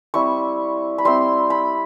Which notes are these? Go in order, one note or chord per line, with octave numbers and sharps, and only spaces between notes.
G3 C4 E4 C#6
B5
G3 C4 E4 C6
B5